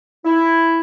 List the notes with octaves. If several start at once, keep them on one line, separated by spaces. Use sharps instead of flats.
E4